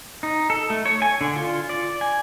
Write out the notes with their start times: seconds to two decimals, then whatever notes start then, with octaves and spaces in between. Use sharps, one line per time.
0.23 D#4
0.50 A4
0.70 A3
0.86 C#5
1.02 G#5
1.21 D3
1.36 F4
1.69 D5
2.01 G#5